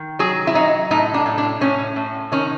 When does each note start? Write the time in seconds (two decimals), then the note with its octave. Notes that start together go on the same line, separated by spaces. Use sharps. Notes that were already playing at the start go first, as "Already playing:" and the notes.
Already playing: D#3
0.19 F#3 G#4
0.47 E4
0.55 F#3 D#4
0.91 A2 D#4
1.14 D4
1.26 A2
1.38 D4
1.61 A2 C#4
1.96 A2
2.32 D#3 C#4